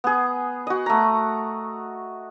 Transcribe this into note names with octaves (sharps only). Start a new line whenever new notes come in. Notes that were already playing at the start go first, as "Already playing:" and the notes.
B3 G#4
F#4 D#5
A3 A#5